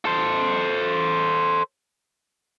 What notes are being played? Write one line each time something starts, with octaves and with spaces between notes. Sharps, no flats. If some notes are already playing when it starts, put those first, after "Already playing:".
A4 C5